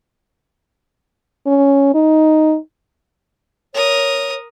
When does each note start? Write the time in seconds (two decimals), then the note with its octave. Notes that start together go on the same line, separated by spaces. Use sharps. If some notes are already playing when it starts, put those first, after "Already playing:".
1.47 C#4
1.94 D#4
3.74 A#4 C#5 D#6